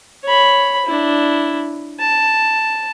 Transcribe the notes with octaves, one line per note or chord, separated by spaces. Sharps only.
C#5 B5
D4 E4
A5